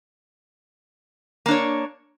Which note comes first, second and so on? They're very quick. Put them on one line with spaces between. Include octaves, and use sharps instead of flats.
A#3 D4 C#5